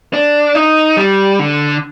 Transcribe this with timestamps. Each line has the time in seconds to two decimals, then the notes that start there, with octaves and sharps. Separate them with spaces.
0.13 D4
0.55 D#4
0.97 G3
1.39 D3